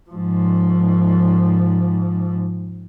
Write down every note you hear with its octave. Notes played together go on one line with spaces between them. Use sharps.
G#2 F3